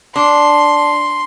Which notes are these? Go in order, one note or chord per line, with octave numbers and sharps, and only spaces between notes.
D4 C6